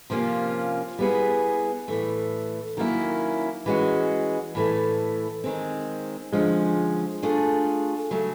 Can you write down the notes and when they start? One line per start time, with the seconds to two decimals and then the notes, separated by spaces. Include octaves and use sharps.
0.10 C3 F3 A#3 C#4 F4
0.99 G3 B3 E4 G#4
1.88 A2 E3 A3
2.77 D#3 F#3 A#3 C#4 E4
3.66 E3 G#3 C#4 F#4
4.55 A2 E3 A3
5.44 D#3 G#3 C4
6.32 D3 F3 G#3 C#4
7.22 A3 D4 F4 G#4
8.11 C#3 F#3 A3